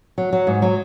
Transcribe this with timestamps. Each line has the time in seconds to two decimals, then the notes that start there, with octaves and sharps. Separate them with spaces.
0.18 F#3
0.33 F#3
0.47 G#2
0.62 F#3